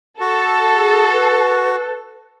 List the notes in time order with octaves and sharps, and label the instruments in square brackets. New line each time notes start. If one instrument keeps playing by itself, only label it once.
[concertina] F#4 [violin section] A4
[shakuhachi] G#4
B4